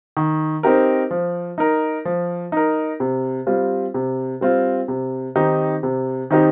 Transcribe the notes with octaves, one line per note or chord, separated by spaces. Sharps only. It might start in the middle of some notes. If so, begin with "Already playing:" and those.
D#3
C4 D#4 G4 A#4
F3
D#4 A#4
F3
D#4 A#4
C3
G3 C4 F4
C3
G3 C4 F4
C3
D#3 C4 D#4 G4
C3
D#3 C4 D#4 G4